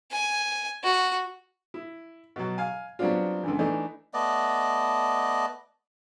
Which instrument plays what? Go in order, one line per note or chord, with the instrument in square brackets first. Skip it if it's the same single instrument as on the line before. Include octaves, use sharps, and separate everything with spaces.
[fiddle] G#5
F#4
[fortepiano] E4
B2 F#3
F5 G#5
F#3 G3 B3 C4 D4 F4
C#2 D3 E3
E3 A3 D4 D#4
[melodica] A3 B3 D5 D#5